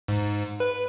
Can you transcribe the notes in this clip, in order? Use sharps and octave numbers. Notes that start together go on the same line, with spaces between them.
G#2
B4